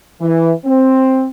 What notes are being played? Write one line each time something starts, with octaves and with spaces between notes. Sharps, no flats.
E3
C4